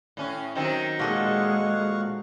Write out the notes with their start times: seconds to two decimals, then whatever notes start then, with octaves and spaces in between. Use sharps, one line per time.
0.17 A2 C#4
0.55 D#3 F#3 C4
0.99 A#2 G#3 A4 D#5 F5 F#5 C#6